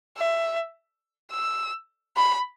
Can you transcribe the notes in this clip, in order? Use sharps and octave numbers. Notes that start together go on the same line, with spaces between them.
E5
E6
B5